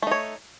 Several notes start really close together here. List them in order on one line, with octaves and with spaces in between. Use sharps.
A3 D#4 C#5